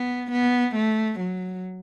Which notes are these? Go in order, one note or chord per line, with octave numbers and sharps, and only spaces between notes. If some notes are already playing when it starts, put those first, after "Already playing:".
Already playing: B3
B3
A3
F#3